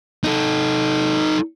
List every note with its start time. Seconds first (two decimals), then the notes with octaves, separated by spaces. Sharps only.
0.24 D#4 A4